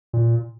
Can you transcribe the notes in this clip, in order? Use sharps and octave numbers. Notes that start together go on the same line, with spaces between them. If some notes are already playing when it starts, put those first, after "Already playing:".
A#2